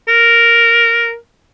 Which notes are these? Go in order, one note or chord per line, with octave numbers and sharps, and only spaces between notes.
A#4